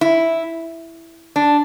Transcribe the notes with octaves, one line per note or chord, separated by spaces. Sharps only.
E4
D4